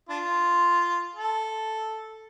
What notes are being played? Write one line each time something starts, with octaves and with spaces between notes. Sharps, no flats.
D4 F4
A4